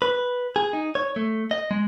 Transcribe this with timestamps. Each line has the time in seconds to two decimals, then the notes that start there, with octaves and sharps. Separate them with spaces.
0.02 B4
0.56 G#4
0.73 D#4
0.95 C#5
1.16 A3
1.51 D#5
1.71 G#3